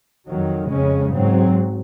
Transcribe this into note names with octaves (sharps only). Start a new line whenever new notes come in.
F2 D#3 F#3
F2 C#3 G#3 C#4
G#2 F#3 C4